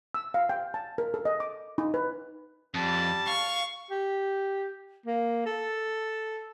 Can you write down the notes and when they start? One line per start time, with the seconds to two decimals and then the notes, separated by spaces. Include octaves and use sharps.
0.14 E6
0.34 F5
0.49 G5
0.74 A5
0.98 A#4
1.14 A4
1.25 D#5
1.40 D6
1.78 D#4
1.94 B4
2.74 F2 G3 A5
3.28 F5 C#6
3.91 G4
5.06 A#3
5.46 A4